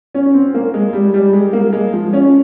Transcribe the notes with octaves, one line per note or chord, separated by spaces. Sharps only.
C#4
C4
A#3
G#3
G3
G3
G#3
A#3
G#3
F3
C#4